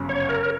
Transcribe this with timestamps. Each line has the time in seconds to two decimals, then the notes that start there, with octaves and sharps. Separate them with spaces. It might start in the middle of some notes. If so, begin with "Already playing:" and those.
Already playing: G1 F#2 C#3
0.09 C#5
0.29 A#4